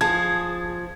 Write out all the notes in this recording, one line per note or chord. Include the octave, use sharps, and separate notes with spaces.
F3 G#4 A5 G#6